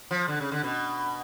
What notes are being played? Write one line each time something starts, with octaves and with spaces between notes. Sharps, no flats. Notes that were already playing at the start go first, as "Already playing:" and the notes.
F3
D3
C#3
D3
B2